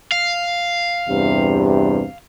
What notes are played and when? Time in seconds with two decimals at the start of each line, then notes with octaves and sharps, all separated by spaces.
0.12 F5
1.07 E2 G2 C3